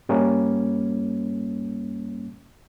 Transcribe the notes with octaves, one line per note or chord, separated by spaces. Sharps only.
G2 G3 A#3 C#4